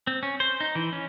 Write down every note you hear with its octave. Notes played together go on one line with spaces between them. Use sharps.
C4
C#4
C5
D#4
E3
C#4